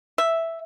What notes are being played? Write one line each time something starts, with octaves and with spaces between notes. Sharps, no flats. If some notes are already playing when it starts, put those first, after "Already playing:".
E5